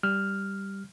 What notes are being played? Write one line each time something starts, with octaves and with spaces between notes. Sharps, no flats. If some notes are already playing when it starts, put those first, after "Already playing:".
G3 F6